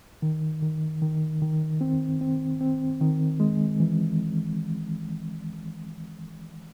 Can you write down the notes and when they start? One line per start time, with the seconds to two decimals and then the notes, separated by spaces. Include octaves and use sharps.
0.22 D#3
0.62 D#3
1.02 D#3
1.42 D#3
1.81 C4
2.21 C4
2.61 C4
3.01 D#3
3.40 G#3
3.80 E3